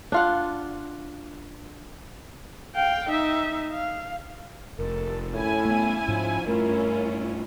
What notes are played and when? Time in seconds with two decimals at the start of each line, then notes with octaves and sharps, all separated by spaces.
0.12 D4 F4 F#5
2.75 F5 G5
3.10 D#4 E5
3.72 F5
4.79 F1 A4 A#4
5.33 A2 C#4 E4 G#5
5.65 A3 B3
6.08 G#2 F3
6.47 G2 A3 C#4 E4 F4 A#4